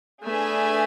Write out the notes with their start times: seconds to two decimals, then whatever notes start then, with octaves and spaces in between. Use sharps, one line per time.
0.24 A3 D4 G#4 B4 E5 G#5